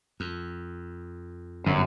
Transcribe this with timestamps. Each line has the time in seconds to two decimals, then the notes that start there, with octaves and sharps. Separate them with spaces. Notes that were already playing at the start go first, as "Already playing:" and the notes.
0.20 F2
1.66 G1 F#2